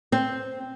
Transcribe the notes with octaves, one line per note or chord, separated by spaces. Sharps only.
C4